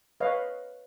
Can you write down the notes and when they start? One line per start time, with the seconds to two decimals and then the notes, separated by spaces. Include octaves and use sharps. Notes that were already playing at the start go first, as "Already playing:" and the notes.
0.20 B4 C#5 D#5 F5